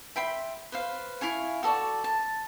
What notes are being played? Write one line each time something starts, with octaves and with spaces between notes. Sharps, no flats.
E5 G5 B5 C6
B4 C5 F5
E4 F5 G#5 C#6
F#4 A4 D5 C#6
A5